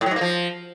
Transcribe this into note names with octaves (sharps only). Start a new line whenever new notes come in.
A2
F#3
G#2
A#3
F3